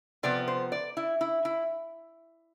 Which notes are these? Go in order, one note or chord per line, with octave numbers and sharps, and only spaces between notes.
C3 F3 B3 D5
C5
D5
E4
E4
E4